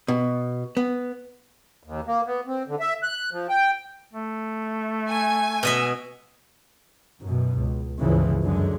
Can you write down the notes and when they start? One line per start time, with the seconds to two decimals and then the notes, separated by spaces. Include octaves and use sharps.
0.08 B2
0.77 B3
1.83 D#2
2.07 A#3
2.26 B3
2.47 C4
2.68 D3
2.80 E5
3.03 F#6
3.32 F3
3.49 G5
4.13 A3
5.09 G#5
5.63 B2 D#5 E5
7.22 F#2 B2
7.61 C#2
8.00 G1 C#2 C#3 E3 F3
8.43 F#2 D3 G#3